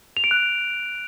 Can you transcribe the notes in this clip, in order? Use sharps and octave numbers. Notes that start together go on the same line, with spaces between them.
F7
D7
F#6